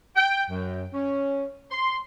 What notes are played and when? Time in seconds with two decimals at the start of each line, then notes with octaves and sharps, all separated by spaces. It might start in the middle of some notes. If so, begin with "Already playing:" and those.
0.16 G5
0.50 F#2
0.94 C#4
1.71 C6